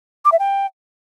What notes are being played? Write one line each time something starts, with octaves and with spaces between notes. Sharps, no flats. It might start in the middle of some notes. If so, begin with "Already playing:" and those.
D6
E5
G5